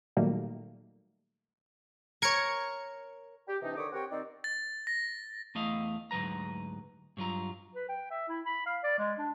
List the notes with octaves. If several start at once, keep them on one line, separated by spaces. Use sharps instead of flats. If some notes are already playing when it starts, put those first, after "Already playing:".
A#2 D#3 F#3 G3 A3 A#3
A#4 C#5 G#6 C#7
G4
C3 E3 D4 D#4
D3 D#3 B4 C#5 D6 D#6
C4 G4 A#4 C#5 F#5 G5
D#3 C4 D5
A6
A#6
E2 A3 D#5 F5
D2 G#2 F#3 B4 A#5
G2 F#3 F4 A#5
B4
G5
E5
E4
B5
F5
D5
G#3
D4